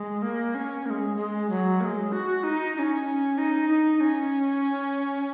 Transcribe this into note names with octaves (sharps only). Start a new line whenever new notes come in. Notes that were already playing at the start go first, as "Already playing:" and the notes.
Already playing: G#3
A#3
C#4
A#3
G#3
G#3
F#3
A#3
G#3
F#4
D#4
D#4
C#4
D#4
D#4
C#4